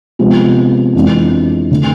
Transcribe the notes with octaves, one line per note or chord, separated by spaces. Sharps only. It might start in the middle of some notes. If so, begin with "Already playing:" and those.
C3 F3 G#3 B3
F2 E3 G#3 D4
D3 A3